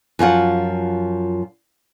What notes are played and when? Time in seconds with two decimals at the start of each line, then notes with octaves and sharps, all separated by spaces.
0.19 F#2 F3 F4 F#5